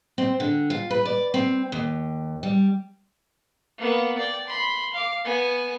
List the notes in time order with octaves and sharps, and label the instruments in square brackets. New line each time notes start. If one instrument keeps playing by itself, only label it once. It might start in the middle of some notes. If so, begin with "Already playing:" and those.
[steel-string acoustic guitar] C4
D3
F4
B4
D5
C4
D#2
G3
[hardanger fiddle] A#3 B3
D5 G5
B5 C6
F5 D6
B3 G#5